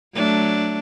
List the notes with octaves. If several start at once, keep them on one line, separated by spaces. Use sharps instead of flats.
F#3 A3 D4